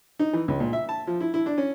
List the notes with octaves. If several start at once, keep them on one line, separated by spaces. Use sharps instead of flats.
D#4
E3
C#2
A#2
E5
A5
F3
E4
E4
D4
C#4